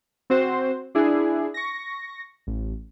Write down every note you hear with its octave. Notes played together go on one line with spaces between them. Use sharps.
C4 F#4 C5
D4 E4 G#4
C#6 A#6
A1